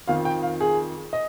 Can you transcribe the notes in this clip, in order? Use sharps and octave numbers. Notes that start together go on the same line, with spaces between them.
F2 D#3 F5
G5
F5
G#4
D#5